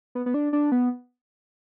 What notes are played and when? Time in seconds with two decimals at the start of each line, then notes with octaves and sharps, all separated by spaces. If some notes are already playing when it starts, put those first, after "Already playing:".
0.15 B3
0.26 B3
0.34 D4
0.53 D4
0.72 B3